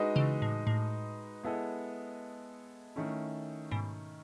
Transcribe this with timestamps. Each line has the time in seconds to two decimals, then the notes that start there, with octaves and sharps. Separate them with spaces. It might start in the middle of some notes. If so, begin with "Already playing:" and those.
Already playing: G#3 D#4 F#4 B4 D#5
0.16 C#3 E3
0.42 A2
0.67 A2
1.44 G#3 B3 E4 A4 D#5
2.96 D#3 A3 C#4 E4
3.71 G#2 B2